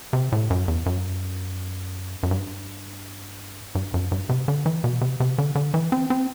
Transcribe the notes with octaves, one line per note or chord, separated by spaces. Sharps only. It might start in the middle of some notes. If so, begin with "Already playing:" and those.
C3
A2
F#2
E2
F#2
F#2
G2
G2
F#2
G2
C3
D3
E3
B2
C3
C3
D3
D3
E3
C4
C4